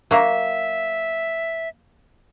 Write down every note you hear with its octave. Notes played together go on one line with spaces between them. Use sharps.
F#3 A#3 E5